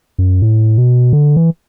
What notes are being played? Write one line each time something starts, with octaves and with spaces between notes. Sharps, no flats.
F#2
A2
B2
D3
E3